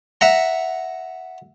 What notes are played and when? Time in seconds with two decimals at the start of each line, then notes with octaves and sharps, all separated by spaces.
0.21 E5 F#5 A#5